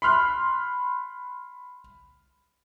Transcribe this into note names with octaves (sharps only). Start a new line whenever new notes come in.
B5 C6 F6 F#6